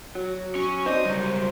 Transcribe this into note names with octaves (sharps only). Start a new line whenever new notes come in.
F#3 F#4
C#4 C#6
C4 D#4 C5 D5 D#5
C#2 F#3 G3